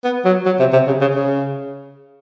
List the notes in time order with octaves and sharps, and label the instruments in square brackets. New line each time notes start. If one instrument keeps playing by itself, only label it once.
[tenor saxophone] B3
F#3
F#3
C3
C3
C#3
C#3
C#3